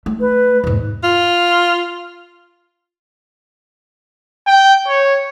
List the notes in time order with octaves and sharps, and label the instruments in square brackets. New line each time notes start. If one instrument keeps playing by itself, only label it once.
[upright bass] A3
[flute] B4
[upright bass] E2 G#2
[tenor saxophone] F4
[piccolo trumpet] G5
C#5